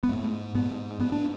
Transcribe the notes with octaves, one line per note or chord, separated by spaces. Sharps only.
B3
G#2 A3
G#2 B3
G#2 B3
D4